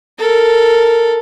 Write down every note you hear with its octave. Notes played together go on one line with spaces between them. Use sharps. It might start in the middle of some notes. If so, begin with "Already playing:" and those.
A4 A#4